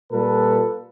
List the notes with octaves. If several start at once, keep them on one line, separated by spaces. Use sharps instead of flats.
A#2 G3 A4 B4